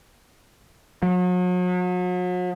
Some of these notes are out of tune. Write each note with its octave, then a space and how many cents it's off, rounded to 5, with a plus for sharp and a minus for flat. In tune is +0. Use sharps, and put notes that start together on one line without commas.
F#3 -40